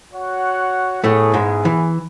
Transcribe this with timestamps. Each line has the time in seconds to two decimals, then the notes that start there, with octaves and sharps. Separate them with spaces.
0.12 F#4 C#5 F#5
1.04 A2 A3 B3 E4 G#4
1.34 G#2 G#3
1.65 E3